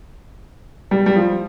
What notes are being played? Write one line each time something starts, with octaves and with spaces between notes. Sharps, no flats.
G3
G3
F3